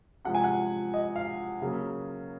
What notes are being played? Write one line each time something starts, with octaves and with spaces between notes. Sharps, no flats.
C3 F3 G#3 F#5
G#5
F#5
D#5
F5
C#3 F#3 A#3